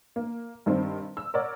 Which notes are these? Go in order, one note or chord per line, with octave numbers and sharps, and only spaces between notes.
A#3
G2 D#3 C4
E6
A#4 C#5 D5 F#5